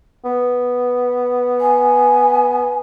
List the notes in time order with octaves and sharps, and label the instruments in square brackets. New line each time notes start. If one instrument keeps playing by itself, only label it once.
[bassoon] B3
[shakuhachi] G#5